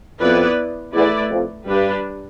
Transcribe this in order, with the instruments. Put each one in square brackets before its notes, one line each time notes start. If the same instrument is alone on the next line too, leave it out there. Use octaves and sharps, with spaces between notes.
[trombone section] F2 [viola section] B3 E4 B4 D5
[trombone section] E2 [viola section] A3 E4 B4 D5
[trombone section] F2
[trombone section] G2 [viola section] G3 D4 G4 B4